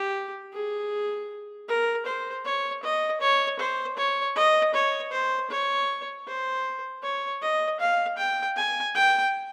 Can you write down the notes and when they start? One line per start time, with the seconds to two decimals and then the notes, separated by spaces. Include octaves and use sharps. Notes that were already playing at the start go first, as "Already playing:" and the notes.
Already playing: G4
0.53 G#4
1.68 A#4
2.06 C5
2.45 C#5
2.83 D#5
3.21 C#5
3.59 C5
3.97 C#5
4.36 D#5
4.74 C#5
5.12 C5
5.50 C#5
6.27 C5
7.02 C#5
7.41 D#5
7.79 F5
8.18 G5
8.56 G#5
8.95 G5